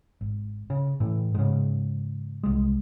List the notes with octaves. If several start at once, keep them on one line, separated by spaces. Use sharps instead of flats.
G#1
C#3
A2 E3
G#2 C#3
C2 G#3